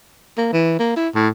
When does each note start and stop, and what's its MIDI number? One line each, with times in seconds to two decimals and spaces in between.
0.38 0.49 58
0.53 0.76 52
0.79 0.94 58
0.96 1.08 64
1.15 1.28 45